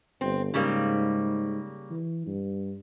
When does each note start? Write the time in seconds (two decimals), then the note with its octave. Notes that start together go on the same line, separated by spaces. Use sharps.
0.21 G1 C4
0.54 G#2 C#3 G3 A#3
1.90 E3
2.26 G2